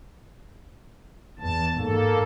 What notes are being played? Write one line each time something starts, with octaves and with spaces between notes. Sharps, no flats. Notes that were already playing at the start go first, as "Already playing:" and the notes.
E2 A5
G#2 A#3 A4